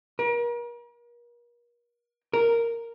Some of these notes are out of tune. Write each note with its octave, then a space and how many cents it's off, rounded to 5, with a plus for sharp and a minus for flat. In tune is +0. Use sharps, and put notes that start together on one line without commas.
A#4 +40
A#4 -5